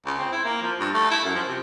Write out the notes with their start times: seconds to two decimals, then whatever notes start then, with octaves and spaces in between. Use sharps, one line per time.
0.06 C#2
0.18 C4
0.32 E4
0.45 A#3
0.62 F3
0.79 G2
0.94 A3
1.11 E4
1.24 F#2
1.35 F3
1.48 C3